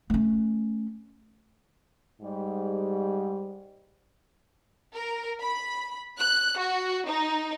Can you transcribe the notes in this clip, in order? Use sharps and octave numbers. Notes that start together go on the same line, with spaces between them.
A3 C#4
G#2 G3
A#4
B5
F#6
F#4
D#4